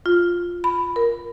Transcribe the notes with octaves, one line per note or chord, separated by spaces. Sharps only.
F4
B5
A#4